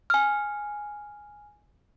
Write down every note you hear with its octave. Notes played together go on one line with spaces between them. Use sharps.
G#5 F6